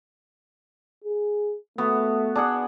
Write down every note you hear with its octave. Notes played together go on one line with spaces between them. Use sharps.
G#4
A3 B3 F#4
D4 G#4 F#5